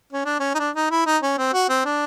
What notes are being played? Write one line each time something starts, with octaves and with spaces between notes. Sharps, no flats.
C#4
D4
C#4
D#4
D4
D#4
E4
D#4
C#4
C4
F#4
C4
D4